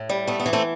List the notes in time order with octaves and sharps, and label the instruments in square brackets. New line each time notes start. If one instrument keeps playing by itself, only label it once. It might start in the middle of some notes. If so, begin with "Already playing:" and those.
Already playing: [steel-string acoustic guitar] A2
G3
A3 B3
B3
E3
A3 C4